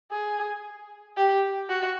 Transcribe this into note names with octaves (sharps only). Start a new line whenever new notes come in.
G#4
G4
F#4